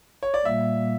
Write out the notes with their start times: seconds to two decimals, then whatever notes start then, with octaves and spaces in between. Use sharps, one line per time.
0.23 C#5
0.34 D5
0.45 A#2 G3 A#3 E5